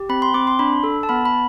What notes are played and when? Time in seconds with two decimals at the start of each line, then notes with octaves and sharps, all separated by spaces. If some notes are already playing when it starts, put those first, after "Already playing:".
Already playing: G4
0.09 C4 B5
0.22 C6
0.34 C4 D6
0.47 C6
0.59 D4 B5
0.84 A4
1.03 A5
1.09 B3 B5
1.25 B5